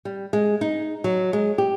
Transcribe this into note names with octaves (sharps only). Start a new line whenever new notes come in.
G3
G#3
D#4
F#3
G#3
G4